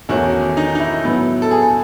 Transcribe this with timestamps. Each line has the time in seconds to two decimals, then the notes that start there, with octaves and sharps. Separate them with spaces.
0.09 E2 D#3 A3 C#4 F#4
0.57 D#4
0.75 D#4
0.80 E4
1.04 A2 F#3 B3
1.42 A4
1.51 G#4